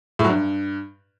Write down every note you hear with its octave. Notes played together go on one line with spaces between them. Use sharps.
A2
F#3
G2